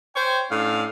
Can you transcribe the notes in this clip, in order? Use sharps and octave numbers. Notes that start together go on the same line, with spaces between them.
C5 C#5 G5
A2 C#4 D4 F5